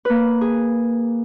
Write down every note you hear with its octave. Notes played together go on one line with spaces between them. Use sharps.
A#3 B4
G#4